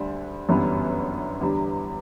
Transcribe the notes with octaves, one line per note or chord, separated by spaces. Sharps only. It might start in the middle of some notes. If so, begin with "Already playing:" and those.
Already playing: D2 D3 G3 D4
G1 F#2 E3 G3 B3
E2 D3 G3